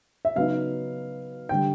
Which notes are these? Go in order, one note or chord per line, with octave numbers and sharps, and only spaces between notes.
E5
C#3 F#3 B3 D#4 F5
D3 G3 G5